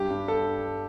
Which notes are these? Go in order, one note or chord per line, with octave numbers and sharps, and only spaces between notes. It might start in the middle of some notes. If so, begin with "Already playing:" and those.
Already playing: G2 G3 G4
G2
A4